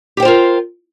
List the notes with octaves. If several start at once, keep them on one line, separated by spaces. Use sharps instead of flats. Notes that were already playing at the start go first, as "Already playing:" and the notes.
F4 G4 A#4 C5 G5